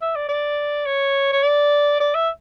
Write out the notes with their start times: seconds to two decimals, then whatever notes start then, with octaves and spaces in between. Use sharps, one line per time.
0.01 E5
0.15 D5
0.29 D5
0.86 C#5
1.32 C#5
1.43 D5
2.00 D5
2.15 E5